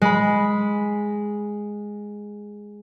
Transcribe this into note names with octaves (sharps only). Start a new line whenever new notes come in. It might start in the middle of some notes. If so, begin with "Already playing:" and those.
G#3 B5